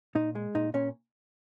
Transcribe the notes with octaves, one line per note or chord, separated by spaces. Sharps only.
A#2 D#4
G#3
A#2 D#4
A#2 C#4